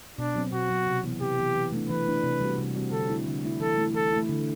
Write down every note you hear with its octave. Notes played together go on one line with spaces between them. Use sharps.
B2 D4
F#3 C4
B2 F#4
F#3 C4
C3
E3 B3
C3 G4
E3 B3
E3
A3 D4
E3 B4
A3 D4
C3
G3 C4 F#4
C3
G3 C4 F#4
D3 A4
A3 E4
D3
A3 E4
E3 A4
A3 E4
E3 A4
A3 E4
D3